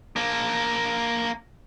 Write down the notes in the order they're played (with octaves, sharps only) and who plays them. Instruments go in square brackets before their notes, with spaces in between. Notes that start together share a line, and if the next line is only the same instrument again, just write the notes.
[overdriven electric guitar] A#3 D4